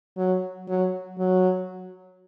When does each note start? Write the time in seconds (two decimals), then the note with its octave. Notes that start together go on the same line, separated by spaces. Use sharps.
0.17 F#3
0.68 F#3
1.18 F#3